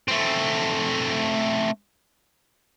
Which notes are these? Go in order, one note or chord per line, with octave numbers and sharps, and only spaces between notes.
A3 C4